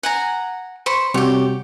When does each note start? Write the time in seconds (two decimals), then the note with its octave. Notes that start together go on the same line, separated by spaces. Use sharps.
0.03 F#5 G#5 A#5
0.86 C5 B5 C#6
1.14 C3 G3 F#4 G4 C#5